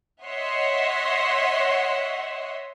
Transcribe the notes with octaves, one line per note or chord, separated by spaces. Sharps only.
C#5 D#5 E5 F#5 C6